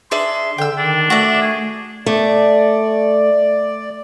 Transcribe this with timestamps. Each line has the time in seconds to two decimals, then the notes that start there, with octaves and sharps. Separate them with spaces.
0.11 D4 G#4 E5 C6
0.58 D3 G5 E6
0.78 D#3 D4
1.10 A3 F#4 D5 E5
1.41 G#4
2.06 A3 D5